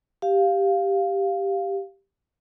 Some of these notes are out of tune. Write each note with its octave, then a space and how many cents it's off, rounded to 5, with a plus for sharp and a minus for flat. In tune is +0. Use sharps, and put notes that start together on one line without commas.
G4 +0 F5 +0